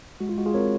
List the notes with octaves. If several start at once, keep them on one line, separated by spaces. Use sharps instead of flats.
G#3 F#4
F4
G#3 F#4
F4 G#4
C4 A#4 C#5